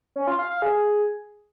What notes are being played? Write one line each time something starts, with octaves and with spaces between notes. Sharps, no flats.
C#4
F4
F5
F5
G#4